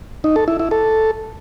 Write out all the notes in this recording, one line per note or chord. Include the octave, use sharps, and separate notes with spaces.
D#4
A4
E4
E4
A4